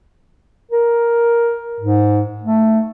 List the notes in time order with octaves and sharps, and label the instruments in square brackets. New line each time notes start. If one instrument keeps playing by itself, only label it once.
[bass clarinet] A#4
G#2
A3